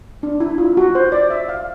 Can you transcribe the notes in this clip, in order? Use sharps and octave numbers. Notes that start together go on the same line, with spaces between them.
D4
E4
F4
F#4
C5
D5
E5
F5